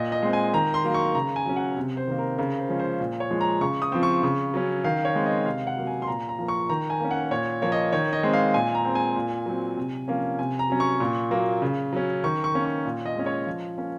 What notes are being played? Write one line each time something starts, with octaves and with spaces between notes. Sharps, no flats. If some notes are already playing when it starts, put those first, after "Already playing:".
Already playing: A#2 D#5
D#5
G#3 C4
G#5
D#3 A#5
C6
F#3 A#3
C#6
C#3 A#5
G#5
F#3 C#4
F#5
C3
C5
D#3 A#3
A#4
C#3 A#4
C5
F3 G#3 C#4
C5
A#2
C#5
F3 G#3
A#5
C#3 C#6
D#6
F3 C4
C#6
C#3
F#3 C#4
D#3 F5
C#5
G#3 C4
D#5
C3 F5
F#5
F#3 A#3
G#5
C6
A#2 A#5
A#5
F3 A#3
C#6
D#3 A#5
G#5
A#3 C#4
F#5
A#2 C#5
F3 A#3 C#5
D#5
D#3 C#5
D#5
G#3 C4
F5
A#2 G#5
A#5
G#3 C4
G#5
A#2
F#3 C4
C3
F3 A#3 C#4
C3 G#5
A#5
F#3 C#4
C#6
A#2
F#3 A#3
C#3
F#3 C#4
D#3 C#6
C#6
A#3 C#4
C#6
A#2
D#5
G#3 C#4
C#5
F3
A#3 C#4